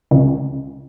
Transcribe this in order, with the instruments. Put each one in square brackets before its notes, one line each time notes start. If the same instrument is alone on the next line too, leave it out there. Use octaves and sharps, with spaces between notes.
[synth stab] C#2